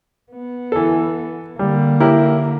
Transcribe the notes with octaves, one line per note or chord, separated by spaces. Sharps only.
B3
E3 A4
D3 G3 A#3
E4 G4 A#4